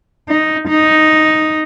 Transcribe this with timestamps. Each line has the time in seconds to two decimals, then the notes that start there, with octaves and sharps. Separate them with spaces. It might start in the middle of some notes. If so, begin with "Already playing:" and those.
0.29 D#4
0.68 D#4